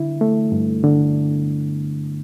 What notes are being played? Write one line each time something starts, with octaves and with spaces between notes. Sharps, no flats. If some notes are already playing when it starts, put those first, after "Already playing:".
Already playing: D3 E4
A3
G2
D3